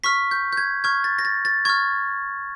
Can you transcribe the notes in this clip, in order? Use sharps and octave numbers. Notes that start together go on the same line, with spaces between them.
C#6 F6 B6
G6
G6
G#6
C#6 F6 G#6
A6
A#6
A6
A6
C#6 F6 G#6